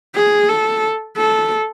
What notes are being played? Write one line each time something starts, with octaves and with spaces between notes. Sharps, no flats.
G#4
A4
A4